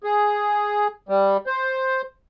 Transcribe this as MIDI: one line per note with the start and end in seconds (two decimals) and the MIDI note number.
0.04 0.88 68
1.09 1.37 55
1.47 2.02 72